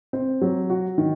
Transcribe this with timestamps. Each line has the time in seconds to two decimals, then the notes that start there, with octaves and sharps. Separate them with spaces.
0.13 C4
0.41 F#3
0.70 F#4
0.98 D#3